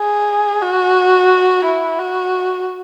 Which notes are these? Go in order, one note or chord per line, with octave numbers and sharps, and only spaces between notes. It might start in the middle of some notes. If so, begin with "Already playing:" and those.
Already playing: G#4
F#4
E4
F#4